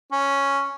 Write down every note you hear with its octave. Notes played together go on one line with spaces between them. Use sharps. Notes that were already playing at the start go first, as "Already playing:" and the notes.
C#4